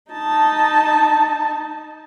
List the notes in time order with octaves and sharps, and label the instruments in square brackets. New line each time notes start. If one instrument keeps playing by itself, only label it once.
[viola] D#4 A5